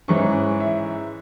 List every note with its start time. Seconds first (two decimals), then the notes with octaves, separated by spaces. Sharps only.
0.08 G#2 E3 G#3 C#4 C#6
0.60 E5